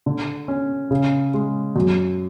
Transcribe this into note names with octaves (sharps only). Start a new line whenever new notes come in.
D3
C#4
C#3
G#3
F#2